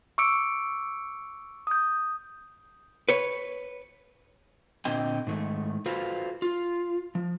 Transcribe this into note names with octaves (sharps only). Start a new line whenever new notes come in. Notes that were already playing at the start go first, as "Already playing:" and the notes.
C#6 D6 E6 C#7 D7
D#6 G6
B4 C#5
A#2 D3 C4 D#5 G5
G#2 D#3 A3
F4 F#4 A4 B4 C5 F5
F4
F3